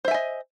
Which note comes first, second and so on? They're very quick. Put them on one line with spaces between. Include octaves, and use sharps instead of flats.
C5 E5 G#5 D#5